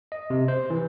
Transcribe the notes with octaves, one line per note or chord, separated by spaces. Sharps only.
D#5
C3
C5
E3